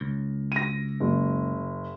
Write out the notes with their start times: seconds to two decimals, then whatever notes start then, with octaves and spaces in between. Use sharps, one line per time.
0.01 C#2
0.52 A#6 D#7
1.00 F#1